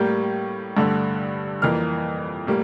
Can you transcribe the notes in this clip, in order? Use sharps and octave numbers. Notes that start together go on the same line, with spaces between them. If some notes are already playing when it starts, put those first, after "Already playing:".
Already playing: A2 G3 A#3 G6
G2 D3 A3
F2 E3 A#3 F6
A2 G3 A#3